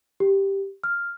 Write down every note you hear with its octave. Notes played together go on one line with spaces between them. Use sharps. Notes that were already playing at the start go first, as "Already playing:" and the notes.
G4
F6